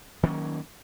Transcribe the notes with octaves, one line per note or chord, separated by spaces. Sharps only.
D#3 F#3 A#3 C#4